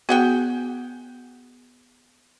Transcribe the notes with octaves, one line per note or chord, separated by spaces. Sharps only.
B3 F#4 G#4 F#5 G5